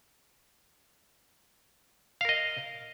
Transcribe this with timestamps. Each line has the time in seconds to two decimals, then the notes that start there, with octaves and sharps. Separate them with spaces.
2.21 F5
2.25 A#4
2.29 D#5